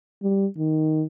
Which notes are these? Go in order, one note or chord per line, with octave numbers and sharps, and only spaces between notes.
G3
D#3